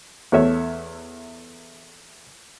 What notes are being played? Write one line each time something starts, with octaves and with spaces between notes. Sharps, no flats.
E2 A3 C#5 E5